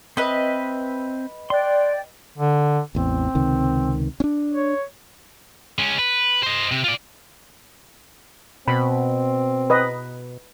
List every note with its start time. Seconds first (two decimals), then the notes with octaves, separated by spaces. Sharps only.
0.17 C4 B4 D#5 E5
1.50 D5 G5 C6 F#6
2.38 D3
2.95 A1 E2 C4
3.35 C#2 C3 D#3
4.20 C#4 D4
4.53 C#5
5.79 G#3 C#4
5.98 B4
6.43 C5 D#5
6.72 C3
6.84 F4 D5
8.68 B2 C4 B5
9.70 B4 D#5